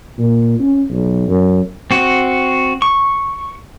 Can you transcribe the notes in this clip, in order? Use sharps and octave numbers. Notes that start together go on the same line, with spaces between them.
A#2
C#4
B1
F#2
C4 F#4
C#6